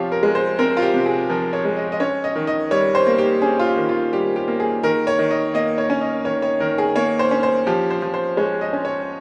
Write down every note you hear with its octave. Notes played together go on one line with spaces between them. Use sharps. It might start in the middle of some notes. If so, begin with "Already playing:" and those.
Already playing: C3 F3 C4 F4 G4 C#5
A#4
G#3
C5
C4 A#4
F4
G4
C3
G#4
F3 A#4
C#5
G#3
D#5
D#5
C#4 C#5
D#5
D#3
D#5
G3 C#5
C5
A#3
G4
C#4 G#4
F4
G4
D#3
F4
G3 G4
G4
A#3
G#4
D#3 A#4
C#5
D#3
D#5
A#3 D#5
C#5
C#4
D#5
D#3 C#5
C#5
D#3 A#4
G#4
A#3 C#5
C5
C#4
C5
F3 G4
C5
F3
C5
G#3 C#5
D#5
C#4
C#5